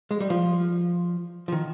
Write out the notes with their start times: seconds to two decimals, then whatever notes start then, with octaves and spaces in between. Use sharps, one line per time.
0.11 G#3
0.20 G3
0.30 F3
1.48 F3
1.52 D#3